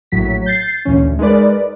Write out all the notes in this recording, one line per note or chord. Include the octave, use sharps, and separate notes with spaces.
A#1 A2 F#3 B6
G6 A6 C7
D2 A#2 E3 C#4
D2
G#3 D#4 A#4 B4 D5